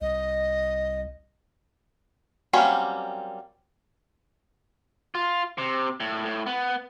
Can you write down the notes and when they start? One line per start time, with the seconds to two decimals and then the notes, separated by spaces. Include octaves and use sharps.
0.01 C2 D#5
2.53 F#3 G3 A#3 C4 C#4
5.15 F4
5.58 C3
6.00 A2
6.25 A2
6.46 B3